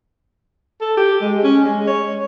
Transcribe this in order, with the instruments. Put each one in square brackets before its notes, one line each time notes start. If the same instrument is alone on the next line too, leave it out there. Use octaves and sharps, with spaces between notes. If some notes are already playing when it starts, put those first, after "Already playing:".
[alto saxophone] A4
G4
G#3
C#4
G#3
C#5